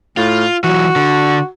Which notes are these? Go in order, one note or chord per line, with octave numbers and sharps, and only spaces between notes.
A2 F4
E3 F#3 F#4
D3